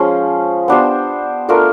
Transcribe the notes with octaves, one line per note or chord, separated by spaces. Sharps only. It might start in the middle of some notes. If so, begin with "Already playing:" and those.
Already playing: F3 G#3 C#4
B3 D4 G4 C5
A3 D4 F4 A#4